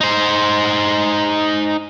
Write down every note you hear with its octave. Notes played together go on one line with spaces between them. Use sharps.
D#4 C5